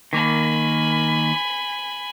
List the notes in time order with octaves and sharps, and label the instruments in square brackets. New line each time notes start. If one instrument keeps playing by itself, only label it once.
[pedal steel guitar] D#3 A#3 [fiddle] G#5 B5